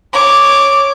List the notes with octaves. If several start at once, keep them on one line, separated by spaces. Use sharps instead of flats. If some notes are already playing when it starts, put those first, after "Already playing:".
C#5 D6